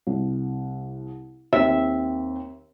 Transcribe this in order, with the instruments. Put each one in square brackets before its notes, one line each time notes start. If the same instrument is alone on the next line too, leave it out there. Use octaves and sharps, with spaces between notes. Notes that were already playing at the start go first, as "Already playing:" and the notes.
[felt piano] C2
[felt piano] D#2 C4 [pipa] E5